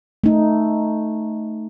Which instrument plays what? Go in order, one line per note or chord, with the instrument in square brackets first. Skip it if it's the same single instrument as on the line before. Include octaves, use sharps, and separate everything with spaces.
[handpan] A3 D#4